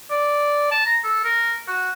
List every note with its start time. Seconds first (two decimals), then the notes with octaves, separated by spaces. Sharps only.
0.11 D5
0.72 A5
0.86 A#5
1.04 A4
1.24 A#4
1.68 F#4